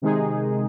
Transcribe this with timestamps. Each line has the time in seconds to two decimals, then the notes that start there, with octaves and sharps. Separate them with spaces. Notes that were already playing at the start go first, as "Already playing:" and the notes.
0.02 C3 D#3 G#3 D#4 G#4